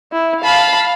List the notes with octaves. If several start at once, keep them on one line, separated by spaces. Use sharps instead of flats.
E4
F5 A5 B5